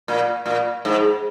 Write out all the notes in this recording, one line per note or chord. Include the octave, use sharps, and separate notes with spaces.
A#2
A#2
G#2